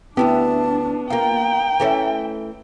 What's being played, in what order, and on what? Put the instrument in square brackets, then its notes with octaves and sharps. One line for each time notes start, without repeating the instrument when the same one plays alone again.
[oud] D2 E4 G4 [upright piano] B3 [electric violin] D4 [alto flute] A5
[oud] A#3 F4 [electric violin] G5 [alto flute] A#5
[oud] E3 A3 C#4